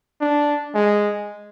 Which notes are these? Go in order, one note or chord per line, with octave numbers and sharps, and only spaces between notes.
D4
G#3